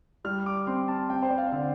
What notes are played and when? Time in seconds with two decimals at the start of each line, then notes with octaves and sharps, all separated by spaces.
0.24 G3 F6
0.46 D6
0.67 C4 C6
0.88 A5
1.10 C4 G5
1.23 C5
1.30 D5
1.38 F5
1.52 D3